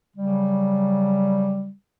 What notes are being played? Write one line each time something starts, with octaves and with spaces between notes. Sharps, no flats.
C#3 F#3 G3